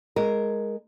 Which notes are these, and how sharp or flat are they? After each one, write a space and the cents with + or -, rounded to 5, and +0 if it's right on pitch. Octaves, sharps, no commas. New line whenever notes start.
G#3 +0 A#4 +0